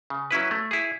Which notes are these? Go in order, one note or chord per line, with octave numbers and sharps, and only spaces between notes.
C#3
F#3 C#4 E4 B4
A3
E4 G#4